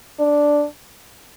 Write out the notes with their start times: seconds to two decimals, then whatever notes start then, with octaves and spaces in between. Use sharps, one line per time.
0.19 D4